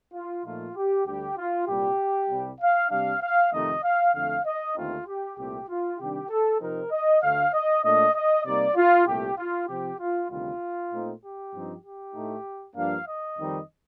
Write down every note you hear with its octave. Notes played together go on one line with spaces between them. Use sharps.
F4
A#2 F3 A3 D#4 F4
G4
D2 D3 G3 G4
F4
C2 A#2 G3 G4
C2 C3 G3
F5
C3 G3 D4 F5
F5
F2 C3 D#3 A3 D#4 D#5
F5
F2 D3 A3 F5
D#5
D#2 D3 A3 C4 D#4 F4
G4
C2 A#2 A3 C4 G4
F4
C3 D#3 G3 D4 G4
A4
C3 F3 C4 D#4 A#4
D#5
D2 D3 A3 F5
D#5
A#2 A3 D4 D#5
D#5
C3 G3 A#3 D#4 D5
F4
C2 A#2 A3 G4
F4
C3 F3 C4 G4
F4
D2 C3 D#3 G3 F4
A#2 A3 C4 D#4
G4
G2 F3 C4 D#4
G4
A2 A3 D#4
G2 F3 A#3 D4 F5
D#5
F2 D#3 G3 C4 D#4